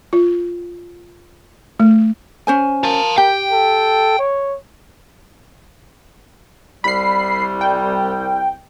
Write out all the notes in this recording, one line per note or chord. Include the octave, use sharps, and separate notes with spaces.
F4
A3
C#4 C5 G#5
A#4 F5 A5
G4 G5
A4
C#5
C2 G3 B5 C7
G5